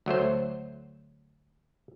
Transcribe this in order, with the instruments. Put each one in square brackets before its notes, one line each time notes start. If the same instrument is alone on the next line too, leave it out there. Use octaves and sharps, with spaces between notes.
[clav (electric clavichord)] D2 F#3 A3 C5